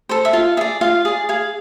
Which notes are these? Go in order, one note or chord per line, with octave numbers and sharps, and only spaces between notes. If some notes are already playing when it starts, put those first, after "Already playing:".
A4 C5
E5
F4 F5
G#4 D5 E5
F4 F5
G#4 D5
G#4 F5